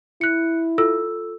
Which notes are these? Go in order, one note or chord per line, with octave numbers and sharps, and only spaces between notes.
E4 F#6 C#7
F4 A4 E6